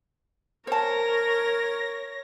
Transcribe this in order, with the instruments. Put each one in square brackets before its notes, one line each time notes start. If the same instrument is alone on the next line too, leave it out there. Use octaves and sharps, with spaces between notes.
[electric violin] A#4 [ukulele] C5 A5 [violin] C#5 A#6